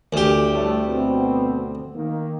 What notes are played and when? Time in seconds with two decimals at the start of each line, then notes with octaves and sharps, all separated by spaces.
0.13 D2 G4
0.51 A2 G3 A3
0.86 B2 B3 C4
1.95 D#3 A#3